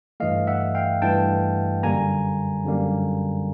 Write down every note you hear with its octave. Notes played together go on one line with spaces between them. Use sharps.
G2 E3 A3 D#5 F5
E5 F#5
F5 G5
G2 E3 A3 G5 A5
F#2 D3 G3 A#3 G#5 A#5
F#2 D3 G3 A#3